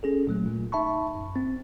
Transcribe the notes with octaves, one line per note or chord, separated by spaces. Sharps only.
C#4 G#4 A4
D2 A#2 F#3 A3
A#2
D#4 E5 A5 B5 C#6
F#2
C4